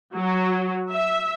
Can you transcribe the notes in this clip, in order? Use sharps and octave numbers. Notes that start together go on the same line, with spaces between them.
F#3
E5